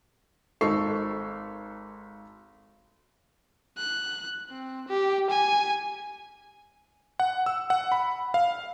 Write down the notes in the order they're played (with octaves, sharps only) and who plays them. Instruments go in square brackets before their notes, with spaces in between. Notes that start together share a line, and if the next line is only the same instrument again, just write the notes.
[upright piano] G#1 D#4 A4 C#6 C7
[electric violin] F#6
C4
G4
G#5
[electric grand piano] F#5
E6
F#5
B5
F5